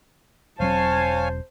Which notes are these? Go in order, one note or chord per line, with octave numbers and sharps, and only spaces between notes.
E1 F#3 C4 C5 C#5 F5 G#5 A5